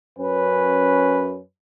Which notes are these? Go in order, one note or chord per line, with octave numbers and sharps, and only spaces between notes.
F#2 C#4 B4